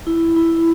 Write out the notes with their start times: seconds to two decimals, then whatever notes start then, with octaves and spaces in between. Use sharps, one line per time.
0.07 E4
0.36 E4